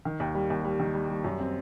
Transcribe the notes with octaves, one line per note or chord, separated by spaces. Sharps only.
D#3
D#2
G3
D#2
G3
D#3
G3
G3
F#2
C4